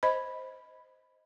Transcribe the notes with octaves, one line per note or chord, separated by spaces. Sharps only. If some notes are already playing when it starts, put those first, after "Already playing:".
C5 D#5 B5